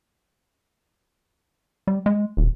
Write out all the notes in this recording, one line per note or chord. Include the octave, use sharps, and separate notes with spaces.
G3
G#3
D#1